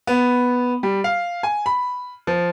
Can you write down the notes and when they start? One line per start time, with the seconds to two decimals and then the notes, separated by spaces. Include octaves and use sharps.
0.07 B3
0.83 G3
1.04 F5
1.43 G#5
1.66 B5
2.27 F3